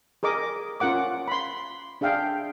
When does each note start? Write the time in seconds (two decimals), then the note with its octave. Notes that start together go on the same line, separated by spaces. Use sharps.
0.23 G#4 A#4 D#5 D6
0.80 C#4 F4 A#4 F#5 D6
1.28 B5 C6
2.01 D4 G#4 E5 F5 G5